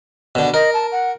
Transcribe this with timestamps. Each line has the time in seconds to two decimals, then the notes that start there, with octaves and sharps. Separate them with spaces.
0.35 B2 D3
0.54 A#4 D#5
0.74 A5
0.92 F#5